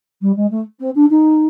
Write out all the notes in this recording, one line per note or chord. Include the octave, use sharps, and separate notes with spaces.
G3
G#3
A3
C4
D4
D#4